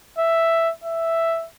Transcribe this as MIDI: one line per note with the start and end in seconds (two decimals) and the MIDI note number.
0.18 0.71 76
0.84 1.46 76